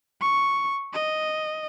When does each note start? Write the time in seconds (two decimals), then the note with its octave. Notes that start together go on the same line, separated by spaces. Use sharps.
0.21 C#6
0.94 D#5